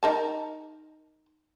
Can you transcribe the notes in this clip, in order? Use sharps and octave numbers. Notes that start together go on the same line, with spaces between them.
D#4 A#4 A5